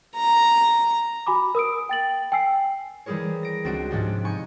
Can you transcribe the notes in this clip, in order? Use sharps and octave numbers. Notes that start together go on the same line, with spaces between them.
A#5
F#4 G#5 B5 D6
A#4 D#6 E6 D7
G5 A6 F#7
G5 G#5 E6 C7
E3 G3 G4 G#4 A#4 C#5
A#6 D7
C#2 C4 D4 F#4 D7
G#2 C3 F3 C#4 D4 G4
D#4 G#5 C#6 G6